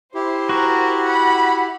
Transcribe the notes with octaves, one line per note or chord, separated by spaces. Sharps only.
E4 G4 C5
F#4 A#4
F#5 B5